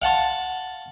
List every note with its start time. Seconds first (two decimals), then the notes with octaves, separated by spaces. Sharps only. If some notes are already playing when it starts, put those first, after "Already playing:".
0.02 F5 F#5 A5 C6